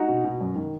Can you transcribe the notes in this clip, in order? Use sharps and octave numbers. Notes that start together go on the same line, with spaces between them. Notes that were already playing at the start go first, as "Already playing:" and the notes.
Already playing: D#4 F#4
B2
B2
F#2
D#3